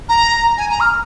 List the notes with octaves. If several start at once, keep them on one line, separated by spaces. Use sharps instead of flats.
A#5
G#5
A#5
F6